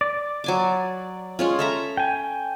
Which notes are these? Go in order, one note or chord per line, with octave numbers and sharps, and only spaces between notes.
D5
F#3 G#5 D6
G#3 C#4 F4
A4 E5 A#5
G5 G#5